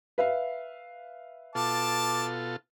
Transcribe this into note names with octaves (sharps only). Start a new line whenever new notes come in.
B4 E5 F5
B2 F4 A4 A5 D6